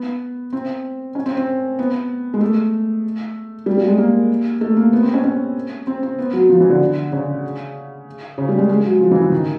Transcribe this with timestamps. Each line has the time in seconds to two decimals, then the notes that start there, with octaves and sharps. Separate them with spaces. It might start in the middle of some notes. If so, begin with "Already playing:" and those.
Already playing: B3
0.53 C4
1.15 C#4
1.26 C4
1.37 C4
1.79 B3
2.34 G#3
2.41 A3
3.66 G3
3.78 G3
3.87 G#3
3.98 A#3
4.61 A3
4.77 A#3
4.93 B3
5.03 C4
5.14 C#4
5.24 C#4
5.87 C4
6.03 C4
6.18 B3
6.33 F#3
6.49 F3
6.60 E3
6.70 D3
7.12 C#3
8.38 C#3
8.49 G3
8.58 G#3
8.69 G#3
8.84 F#3
9.01 F3
9.11 E3
9.21 E3
9.32 D#3